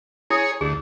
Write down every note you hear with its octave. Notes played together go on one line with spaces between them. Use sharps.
E4 G#4 C#5 D#6
D2 G#4